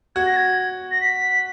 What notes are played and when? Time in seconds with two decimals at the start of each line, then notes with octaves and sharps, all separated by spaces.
0.16 F#4 G#6
0.26 A#6
0.37 G#6
0.91 A#6
1.01 B6